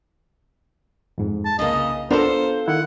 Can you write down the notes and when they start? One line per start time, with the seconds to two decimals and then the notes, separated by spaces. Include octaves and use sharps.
1.18 F2 G#2
1.45 A5
1.59 C2 C#3 A#3 D#5
2.11 B3 D4 F4 A4 A#4 C5
2.68 D#3 E4 F#5